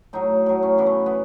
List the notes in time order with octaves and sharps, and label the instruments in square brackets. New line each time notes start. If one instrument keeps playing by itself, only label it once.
[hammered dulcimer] A2 F#3 D#4
A2 F#3
C#4
F#2 C#3 E3 B3
A3
B3